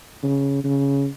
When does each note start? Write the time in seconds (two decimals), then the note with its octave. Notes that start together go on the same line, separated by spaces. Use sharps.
0.23 C#3
0.64 C#3